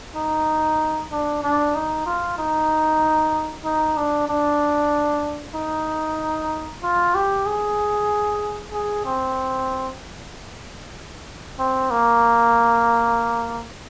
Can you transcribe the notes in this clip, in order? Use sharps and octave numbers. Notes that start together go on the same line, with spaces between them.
D#4
D4
D4
D#4
F4
D#4
D#4
D4
D4
D#4
F4
G4
G#4
G#4
C4
C4
A#3